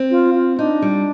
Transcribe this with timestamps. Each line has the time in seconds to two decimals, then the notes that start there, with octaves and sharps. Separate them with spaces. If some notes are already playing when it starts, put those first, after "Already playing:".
Already playing: C4
0.11 F4
0.35 F4
0.58 D4 D#4
0.82 G3